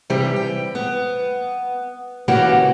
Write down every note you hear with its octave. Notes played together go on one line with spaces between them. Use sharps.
C3 E3 G3 G4
G5
B3
C#3 E3 A#3 F#4 G4 F#5